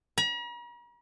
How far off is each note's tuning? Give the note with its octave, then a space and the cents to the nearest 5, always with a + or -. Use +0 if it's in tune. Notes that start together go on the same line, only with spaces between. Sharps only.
A#5 +45